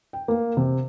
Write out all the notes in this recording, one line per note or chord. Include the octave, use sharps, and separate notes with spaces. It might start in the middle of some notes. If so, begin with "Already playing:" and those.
G5
A#3
C3